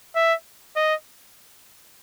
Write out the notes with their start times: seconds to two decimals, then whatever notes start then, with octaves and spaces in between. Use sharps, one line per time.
0.16 E5
0.76 D#5